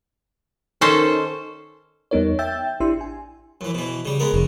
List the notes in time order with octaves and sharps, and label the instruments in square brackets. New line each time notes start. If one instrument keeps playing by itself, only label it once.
[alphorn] D#3 [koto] C#4 A4 C5
[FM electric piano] E2 G3 B3 D#4 A#4 C#5
E5 G5 E6 G6 A6
A1 D4 E4 G4 C6 E6
G#5
[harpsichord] F#2 E3
B2 E3
C#3 G3
G#3 B3 A#4
[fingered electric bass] F1 [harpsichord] C#3